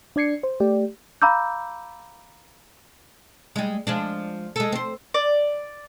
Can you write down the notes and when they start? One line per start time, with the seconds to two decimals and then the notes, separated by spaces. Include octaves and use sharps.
0.16 D4 D5 G#6 C7 C#7
0.43 C5
0.60 A3 G4 D5 G5
1.22 F5 A#5 B5 D6 E6 G6
3.56 G3 G#3
3.87 F3 G#3 D4
4.56 G#3 A4
4.72 C4 C5
5.14 D5